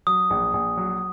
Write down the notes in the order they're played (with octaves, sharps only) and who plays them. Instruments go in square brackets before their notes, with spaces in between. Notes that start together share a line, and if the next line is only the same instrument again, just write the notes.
[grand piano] F#3 [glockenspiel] D#6
[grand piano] A#1
A#1
F#3